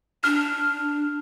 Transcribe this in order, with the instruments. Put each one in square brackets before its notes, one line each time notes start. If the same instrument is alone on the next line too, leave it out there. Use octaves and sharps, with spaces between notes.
[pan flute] D4 [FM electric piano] F6